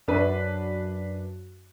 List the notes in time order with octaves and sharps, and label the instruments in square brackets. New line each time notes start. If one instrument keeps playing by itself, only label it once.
[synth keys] F#2 [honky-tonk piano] D4 B4